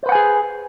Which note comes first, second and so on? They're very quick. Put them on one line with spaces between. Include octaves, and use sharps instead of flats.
C5 B4 F#5 G#5 G#4